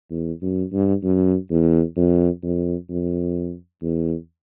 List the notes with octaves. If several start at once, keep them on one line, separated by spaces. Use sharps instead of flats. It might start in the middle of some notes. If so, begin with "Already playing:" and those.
E2
F#2
G2
F#2
E2
F2
F2
F2
E2